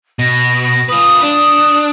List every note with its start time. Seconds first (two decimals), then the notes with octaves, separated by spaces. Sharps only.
0.19 B2 A#6
0.63 A#6
0.89 F4 B4 D#6
1.23 D4